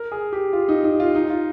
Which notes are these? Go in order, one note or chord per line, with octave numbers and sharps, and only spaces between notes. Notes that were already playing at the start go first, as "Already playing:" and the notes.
Already playing: A#4
G#4
G4
F4
D#4
D#4
F4
D#4
F4